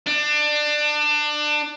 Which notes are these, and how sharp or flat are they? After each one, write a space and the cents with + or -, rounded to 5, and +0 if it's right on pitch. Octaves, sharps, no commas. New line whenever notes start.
D4 +25